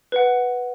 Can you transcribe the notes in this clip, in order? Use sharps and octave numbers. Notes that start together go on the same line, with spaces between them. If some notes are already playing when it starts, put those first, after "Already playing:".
B4 F#5